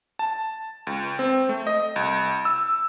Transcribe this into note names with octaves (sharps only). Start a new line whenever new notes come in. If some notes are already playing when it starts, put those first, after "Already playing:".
A5
C#2
C4
A3
D#5
C2
E6